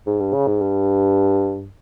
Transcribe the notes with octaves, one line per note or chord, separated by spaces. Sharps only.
G#2
G2
C#3
G#2
G2